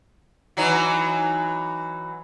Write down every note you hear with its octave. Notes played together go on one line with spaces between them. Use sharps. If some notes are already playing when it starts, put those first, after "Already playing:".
E3 F#3 D#4